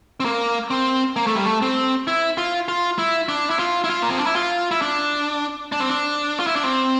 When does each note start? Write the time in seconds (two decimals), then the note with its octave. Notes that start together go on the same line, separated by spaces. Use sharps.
0.20 C4
0.25 A#3
0.70 C4
1.16 A#3
1.27 A3
1.35 G3
1.45 A3
1.62 C4
2.07 E4
2.38 F4
2.68 F4
2.98 E4
3.29 D4
3.50 E4
3.59 F4
3.84 E4
3.90 F4
4.02 A#3
4.10 C4
4.19 D4
4.27 E4
4.35 F4
4.71 E4
4.82 D4
5.72 D4
5.80 C4
5.89 D4
6.39 F4
6.47 E4
6.56 D4
6.64 C4